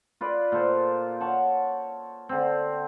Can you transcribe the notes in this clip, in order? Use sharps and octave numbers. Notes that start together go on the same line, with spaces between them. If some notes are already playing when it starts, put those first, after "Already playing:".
F4 B4 D5
A#2 A4 C5
C#5 F#5 A5
D3 C4